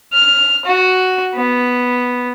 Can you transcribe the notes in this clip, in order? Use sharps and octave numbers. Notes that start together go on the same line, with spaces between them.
F6
F#4
B3